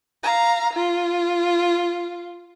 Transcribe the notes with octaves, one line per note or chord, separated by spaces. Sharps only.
F5 A#5
F4